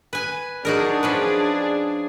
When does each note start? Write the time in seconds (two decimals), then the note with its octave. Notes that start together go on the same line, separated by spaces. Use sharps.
0.13 B4 G#5
0.65 F#3 D4 D#4 G#4 A#4
1.03 F3 C#4 B4